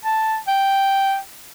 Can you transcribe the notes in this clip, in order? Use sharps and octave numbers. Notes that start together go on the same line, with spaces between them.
A5
G5